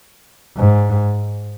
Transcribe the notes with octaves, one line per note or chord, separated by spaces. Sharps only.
G#2